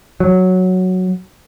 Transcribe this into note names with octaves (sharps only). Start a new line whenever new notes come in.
F#3